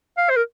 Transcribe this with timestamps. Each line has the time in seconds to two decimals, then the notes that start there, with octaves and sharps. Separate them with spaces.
0.18 F5
0.30 C5
0.36 A#4